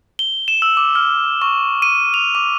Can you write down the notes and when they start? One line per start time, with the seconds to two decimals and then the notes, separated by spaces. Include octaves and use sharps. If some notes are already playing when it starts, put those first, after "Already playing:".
0.19 G7
0.48 E7
0.62 E6
0.77 D6
0.95 F6
1.42 C#6
1.82 D#7
2.14 F7
2.35 D6